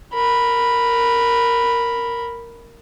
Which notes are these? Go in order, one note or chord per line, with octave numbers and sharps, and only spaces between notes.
A#4 B5